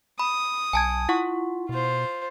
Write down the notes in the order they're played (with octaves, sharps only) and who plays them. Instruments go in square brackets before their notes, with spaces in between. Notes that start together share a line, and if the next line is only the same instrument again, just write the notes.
[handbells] B5 [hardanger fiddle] D#6
[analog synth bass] B1 [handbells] G#5 A5 G#6
[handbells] E4 F#5 C#6 [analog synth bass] F4
[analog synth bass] B2 [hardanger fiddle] F4 C5